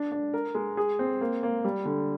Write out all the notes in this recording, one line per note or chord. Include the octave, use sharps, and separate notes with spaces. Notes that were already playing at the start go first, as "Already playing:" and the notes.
Already playing: D4
D4
A#4
G#3
G#4
C4
A#3
A#3
G3
D3